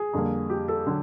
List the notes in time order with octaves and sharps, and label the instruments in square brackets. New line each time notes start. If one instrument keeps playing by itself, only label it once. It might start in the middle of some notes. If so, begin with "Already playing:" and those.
Already playing: [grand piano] G#4
[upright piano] F2 D3 G3 A#3
[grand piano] G4
A4
[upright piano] D3 F#3